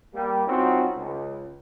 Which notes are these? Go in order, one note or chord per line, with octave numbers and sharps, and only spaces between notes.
G3 A#3
G3 C4 C#4 D#4 F4 F#4
C#2